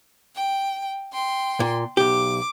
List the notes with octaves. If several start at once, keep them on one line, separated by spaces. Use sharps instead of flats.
G5
G5 C6
A#2
B1 G4 D6